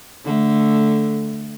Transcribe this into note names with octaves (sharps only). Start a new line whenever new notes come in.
D3 A3